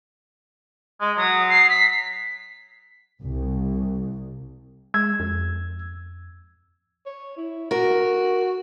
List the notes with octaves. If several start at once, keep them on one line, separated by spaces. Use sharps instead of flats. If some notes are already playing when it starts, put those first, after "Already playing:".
G#3
F#3 D#6
C7
B6
C2
G#3 E6 G#6
F2
C#5
E4
F#4 A#4